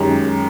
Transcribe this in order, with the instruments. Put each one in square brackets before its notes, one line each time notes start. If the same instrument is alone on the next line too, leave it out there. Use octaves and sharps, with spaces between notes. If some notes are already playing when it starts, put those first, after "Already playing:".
Already playing: [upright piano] F#2 D#3 G#3 G4